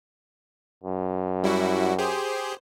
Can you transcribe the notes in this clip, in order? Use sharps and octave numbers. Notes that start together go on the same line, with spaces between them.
F#2
G3 E4 F#4
G4 G#4 C5